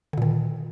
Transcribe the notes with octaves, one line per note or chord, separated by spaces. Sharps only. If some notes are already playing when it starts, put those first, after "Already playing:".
A#2 D3 D#3